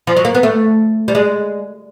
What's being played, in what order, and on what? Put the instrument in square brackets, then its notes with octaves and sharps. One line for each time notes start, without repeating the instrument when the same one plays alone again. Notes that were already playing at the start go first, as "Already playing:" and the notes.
[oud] F3
F#3
A#3
B3
A3
G3
G#3